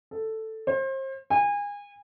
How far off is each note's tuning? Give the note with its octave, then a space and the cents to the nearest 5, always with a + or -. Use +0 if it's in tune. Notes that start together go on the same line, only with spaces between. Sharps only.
A4 +5
C5 +35
G#5 -30